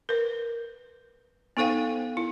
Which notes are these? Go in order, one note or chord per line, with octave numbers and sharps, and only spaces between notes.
A#4 B4
B3 D#4 A4 C5 F5 G5
E4